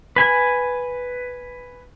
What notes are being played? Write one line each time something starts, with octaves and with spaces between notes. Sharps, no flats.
B4 G#5